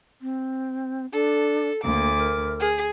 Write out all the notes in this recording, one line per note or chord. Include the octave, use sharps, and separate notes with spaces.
C4
D4 A4
D2 A#3 D6
A#4
G#4